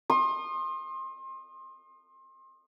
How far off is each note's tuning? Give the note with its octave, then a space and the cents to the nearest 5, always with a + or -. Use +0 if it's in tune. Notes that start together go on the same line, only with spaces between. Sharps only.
C6 +30 D#6 -25